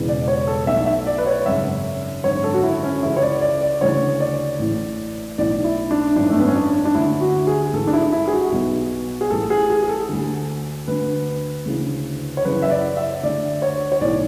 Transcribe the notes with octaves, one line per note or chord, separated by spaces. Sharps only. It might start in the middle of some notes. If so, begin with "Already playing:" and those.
Already playing: E1 E2 C#3 E3
D5
D5
C#5
A4
B1 A2 E3 E5
E5
D5
B4
C#5
G#1 F#2 C#3 E5
G#1 F#2 D3 C#5
A4
F#4
E4
C#4
C#2 C#3 E3 E4
C#5
D5
D5
D5
D2 C#3 E3 C#5
D5
A1 A2 E3
B1 A2 E3 D5
E4
D4
G#1 F#2 E3 D4
A3
B3
C#4
D4
D4
D2 D3 E4
F#4
G#4
A1 G#2 E3 A4
D4
E4
E4
G#4
F#4
B1 B2
G#4
A1 A2 E3 A4
G#4
G#4
G#4
A4
D2 D3
D2 D3 B4
D2 C#3 E3
C#5
F#1 F#2 C#3 E3 B4
E5
D5
E5
D2 D3 D5
C#5
C#5
B1 A2 E3 D5